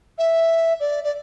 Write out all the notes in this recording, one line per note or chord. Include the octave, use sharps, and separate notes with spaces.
E5
D5
D5